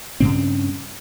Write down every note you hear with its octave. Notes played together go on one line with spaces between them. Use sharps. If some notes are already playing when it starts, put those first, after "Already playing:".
G2 C#3 C4